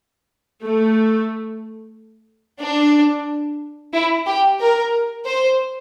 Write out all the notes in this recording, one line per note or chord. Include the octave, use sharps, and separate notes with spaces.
A3
D4
E4
G4
A#4
C5